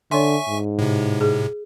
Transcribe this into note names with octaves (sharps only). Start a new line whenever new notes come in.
D3 C#5 E5 G#5 C6 C#6
G#2
A2 C3
G#4